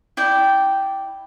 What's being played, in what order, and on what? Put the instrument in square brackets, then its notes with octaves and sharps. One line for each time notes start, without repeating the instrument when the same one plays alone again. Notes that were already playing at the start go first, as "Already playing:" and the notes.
[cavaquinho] E4 D5 G5